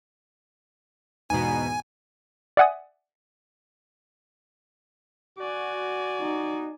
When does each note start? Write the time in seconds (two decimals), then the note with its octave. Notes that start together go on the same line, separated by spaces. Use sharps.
1.30 E2 G#2 B2 D#4 G#5
2.57 D5 E5 F#5 G#5 D#6
5.39 F#4 D5 G#5
6.20 D#4